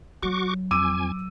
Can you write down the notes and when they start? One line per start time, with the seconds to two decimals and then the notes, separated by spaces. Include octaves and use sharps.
0.23 F#3 F#4 C#6 D6
0.71 F2 G#5 D6 E6 D#7